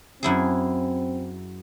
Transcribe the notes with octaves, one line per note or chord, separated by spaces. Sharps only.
F#2 C4 E4 G#4